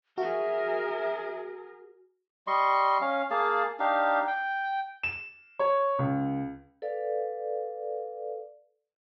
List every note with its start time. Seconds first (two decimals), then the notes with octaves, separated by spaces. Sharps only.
0.18 F#4 G#4 A#4 E5
2.47 G3 D#5 C6 C#6
3.01 C#4 F5
3.31 A#3 G#4 F5 A5
3.80 D4 D#4 G4 F5
4.27 G5
5.03 E7
5.59 C#5
5.99 C#2
6.82 A4 B4 D5 F5